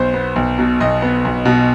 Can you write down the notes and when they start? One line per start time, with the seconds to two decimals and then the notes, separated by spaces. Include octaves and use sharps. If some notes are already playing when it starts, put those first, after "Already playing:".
Already playing: B1 C5
0.14 B3
0.36 B1
0.59 B2
0.80 B1 D#5
1.02 B3
1.25 B1
1.45 B2